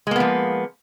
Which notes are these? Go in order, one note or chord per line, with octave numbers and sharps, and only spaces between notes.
F3 G#3 A#3 B3